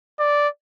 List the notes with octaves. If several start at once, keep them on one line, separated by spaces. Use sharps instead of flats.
D5